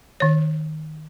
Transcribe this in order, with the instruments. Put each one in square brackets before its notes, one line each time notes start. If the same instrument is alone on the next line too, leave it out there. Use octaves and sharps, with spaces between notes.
[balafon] D#3 C#5